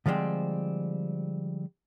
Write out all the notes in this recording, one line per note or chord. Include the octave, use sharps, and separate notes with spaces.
D3 F3 G3 G#3 C4